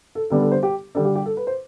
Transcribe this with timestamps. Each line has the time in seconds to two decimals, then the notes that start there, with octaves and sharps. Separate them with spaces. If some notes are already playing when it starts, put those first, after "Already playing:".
0.15 A4
0.30 D3 G3 B3 D4 A4
0.41 A4
0.52 C5
0.63 G4
0.95 D3 G3 D4 A4
1.05 G4
1.16 G4
1.26 A4
1.37 B4
1.47 C5